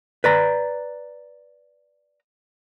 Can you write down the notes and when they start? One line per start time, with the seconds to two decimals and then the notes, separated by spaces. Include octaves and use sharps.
0.24 B4 D5 A#5